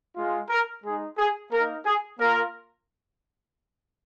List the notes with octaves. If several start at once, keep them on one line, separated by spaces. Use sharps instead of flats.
G#3 F4
A#4
G#3 D#4 G#4
G#4
A#3 D#4 A#4
G#4
A#3 F4 A#4